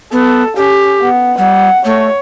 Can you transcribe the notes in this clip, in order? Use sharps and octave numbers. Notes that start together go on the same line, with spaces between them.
B3 A4
C#4 G4
B3
G3 F#5
A3 C#5